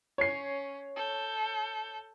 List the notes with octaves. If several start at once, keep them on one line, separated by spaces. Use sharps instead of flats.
C#4 C#5 C7
A4 G6